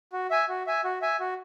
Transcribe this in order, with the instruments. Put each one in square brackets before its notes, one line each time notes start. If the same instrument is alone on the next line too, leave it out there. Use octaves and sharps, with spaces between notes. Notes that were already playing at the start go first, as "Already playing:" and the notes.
[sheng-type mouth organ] F#4
E5 G#5
F#4
E5 G#5
F#4
E5 G#5
F#4